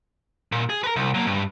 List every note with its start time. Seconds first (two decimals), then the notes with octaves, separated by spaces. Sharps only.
0.52 A#2
0.70 G#4
0.84 A#4 B4
0.96 C2
1.14 F#3 A#3
1.27 G2